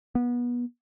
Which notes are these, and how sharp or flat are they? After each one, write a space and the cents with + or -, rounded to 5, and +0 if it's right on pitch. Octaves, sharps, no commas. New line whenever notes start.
B3 -25